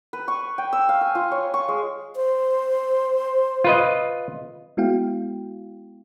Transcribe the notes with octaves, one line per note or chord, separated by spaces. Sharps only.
B4
C#6
G5
E6
F5
G#5
F4
C#5
C#6
G#3
C5
F4 B4 D#5
G#3 B3 E4 F#4 F5 G5